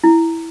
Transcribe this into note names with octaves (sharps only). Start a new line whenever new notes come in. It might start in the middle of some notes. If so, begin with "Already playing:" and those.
E4